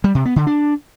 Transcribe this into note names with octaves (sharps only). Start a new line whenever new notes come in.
G3
C3
B3
D3
D4